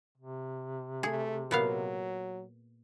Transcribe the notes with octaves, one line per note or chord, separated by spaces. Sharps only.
C3
A3 G#4
A#2 F#3 B3 F5